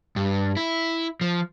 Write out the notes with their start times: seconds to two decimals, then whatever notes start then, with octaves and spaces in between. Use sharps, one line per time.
0.16 G2
0.57 E4
1.21 F3